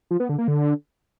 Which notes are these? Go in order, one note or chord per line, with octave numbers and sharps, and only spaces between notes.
F3
B3
D3
A#3
D3